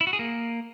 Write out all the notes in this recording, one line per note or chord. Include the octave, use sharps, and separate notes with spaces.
E4
F#4
G#4
A#3